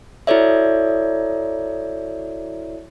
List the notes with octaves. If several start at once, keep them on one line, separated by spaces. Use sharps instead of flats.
E4 F#4 A4 C#5 D5 E5